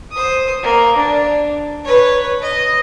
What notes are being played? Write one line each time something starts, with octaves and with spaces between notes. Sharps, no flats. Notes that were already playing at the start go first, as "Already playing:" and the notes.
C5 D#6
A#3
D4
B4 C#5
D#5